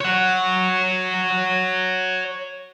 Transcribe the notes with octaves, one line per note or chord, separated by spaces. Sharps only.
C#5 F#5